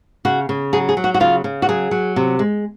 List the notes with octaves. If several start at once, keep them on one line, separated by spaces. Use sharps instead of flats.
C#3 F#4
C#3
F#3 G#4
G#4
F#3
F#4
F#4
C#3 F4
C#3
F#4
F#3 G#4
F#3
C3
G#3